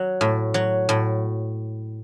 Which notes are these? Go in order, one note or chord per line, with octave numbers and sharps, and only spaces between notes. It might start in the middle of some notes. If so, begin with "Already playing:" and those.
Already playing: F#3
A2
F#3
A2